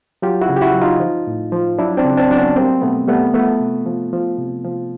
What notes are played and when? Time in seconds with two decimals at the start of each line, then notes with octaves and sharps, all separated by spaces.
0.22 F#3 F4 G4
0.42 E4 F#4
0.49 C#3
0.56 G4
0.62 E4 F#4
0.74 F#3
0.82 D#4 F4
1.00 F3
1.27 A2
1.52 F3
1.78 F#3 D4 E4
1.97 C4 D4
2.04 C#3
2.17 C4 D4
2.30 F#3 D4
2.37 B3 C#4
2.56 G3 A#3 C4
2.82 B2 A3 B3
3.08 G3 A3 B3
3.34 F3 A3 B3
3.60 C3
3.86 F3
4.13 F3
4.38 C3
4.65 F3